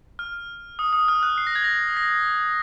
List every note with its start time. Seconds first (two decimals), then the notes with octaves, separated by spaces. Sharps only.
0.19 F6
0.79 D#6
0.93 D#6
1.08 F6
1.23 F#6
1.38 C7
1.47 A#6
1.56 G#6
1.64 A#6
1.97 A#6